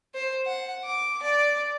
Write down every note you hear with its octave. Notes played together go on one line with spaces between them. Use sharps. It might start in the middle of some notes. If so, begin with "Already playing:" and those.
C5
F#5
D6
D5